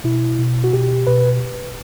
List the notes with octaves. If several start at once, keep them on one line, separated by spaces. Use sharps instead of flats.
B2 E4
B2
F#4
B2 G4
B2 B4